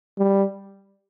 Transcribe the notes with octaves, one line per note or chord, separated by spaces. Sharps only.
G3